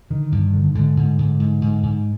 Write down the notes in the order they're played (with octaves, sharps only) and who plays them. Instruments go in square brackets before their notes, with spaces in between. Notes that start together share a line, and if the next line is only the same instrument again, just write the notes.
[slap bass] D3 D#3
G2
D3
G#2 D3
G#2
G#2
G#2
G#2
G#2